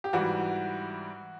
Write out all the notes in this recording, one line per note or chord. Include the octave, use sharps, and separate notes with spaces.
G4
G#2 E3 G3 F#4